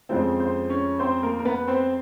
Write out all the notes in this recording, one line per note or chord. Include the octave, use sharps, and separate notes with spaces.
F2 C#3 F3 G#3 C4 C5
C4 C5
C#4 C#5
C4 C5
A#3 A#4
A#4
B3 B4
C4 C5